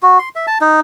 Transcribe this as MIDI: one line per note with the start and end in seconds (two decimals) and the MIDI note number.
0.03 0.18 66
0.19 0.29 84
0.35 0.46 76
0.47 0.58 81
0.61 0.80 63